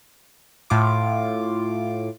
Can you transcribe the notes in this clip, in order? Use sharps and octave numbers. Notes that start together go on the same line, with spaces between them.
A2 F4 D6